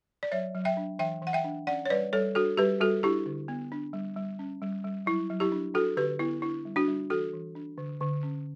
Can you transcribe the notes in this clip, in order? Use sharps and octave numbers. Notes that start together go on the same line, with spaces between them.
D5
F#3 C#5 E5
F#3
E5 G5
D4
E3 E5 G5
E3
F#5
E5 G5
D4
C#4 D5 F#5
C#5
G3 B4 D5
G3 A4 C#5
D4 F#4 A4
G3 G4 B4
G3 F#4 A4
D4 E4 G4
D3
B3
D4
G3
G3
C#4
G3
G3
F#3 E4
F#3
E4 G4
D4
D4 F#4 A4
D3 G4 B4
B3 E4
D4 E4
G3
D4 F#4
G3
E3 F#4 A4
E3
D4
D3
D3
C#4